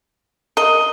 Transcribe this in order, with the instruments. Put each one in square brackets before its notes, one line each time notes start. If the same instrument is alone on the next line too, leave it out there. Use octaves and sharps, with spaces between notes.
[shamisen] A#4 [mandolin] D#5